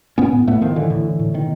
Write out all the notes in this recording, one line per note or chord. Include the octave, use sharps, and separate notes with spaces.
A2 B3 C#4
A2
A2 A3 B3
A2 D#3 F3
A2 D3 E3
A2
A2
A2
B2 D#3